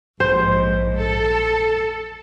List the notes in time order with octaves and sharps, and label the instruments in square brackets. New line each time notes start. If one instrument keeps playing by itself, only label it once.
[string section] A#1 G#2 [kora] C5
[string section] A4